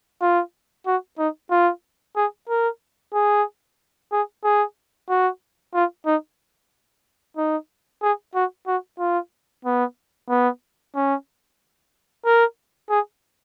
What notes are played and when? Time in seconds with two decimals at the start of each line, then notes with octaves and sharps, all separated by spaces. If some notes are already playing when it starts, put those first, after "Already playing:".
0.22 F4
0.87 F#4
1.19 D#4
1.51 F4
2.16 G#4
2.49 A#4
3.14 G#4
4.12 G#4
4.44 G#4
5.09 F#4
5.75 F4
6.06 D#4
7.37 D#4
8.02 G#4
8.35 F#4
8.67 F#4
8.99 F4
9.65 B3
10.29 B3
10.95 C#4
12.25 A#4
12.90 G#4